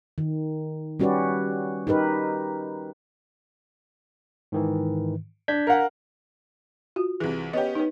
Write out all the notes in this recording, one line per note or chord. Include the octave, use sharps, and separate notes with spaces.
D#3
G3 C#4 F#4 G4 B4 D5
D#4 G4 A#4 B4
G#2 D#3 E3
D4 G6 G#6 B6
A#4 F5 F#5
F4 F#4
C2 E3 G#4
B3 C#4 G4 D#5
D#4 B4